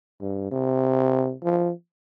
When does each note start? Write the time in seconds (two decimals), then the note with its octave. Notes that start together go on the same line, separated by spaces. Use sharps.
0.21 G2
0.51 C3
1.43 F3